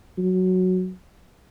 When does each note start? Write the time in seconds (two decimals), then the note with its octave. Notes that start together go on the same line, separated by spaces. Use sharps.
0.18 F#3